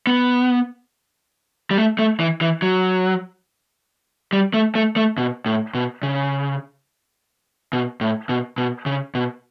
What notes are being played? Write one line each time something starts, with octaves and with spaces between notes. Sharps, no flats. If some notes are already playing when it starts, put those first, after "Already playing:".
B3
G3
A3
A3
E3
E3
F#3
G3
A3
A3
A3
B2
A2
B2
C#3
B2
A2
B2
B2
C#3
B2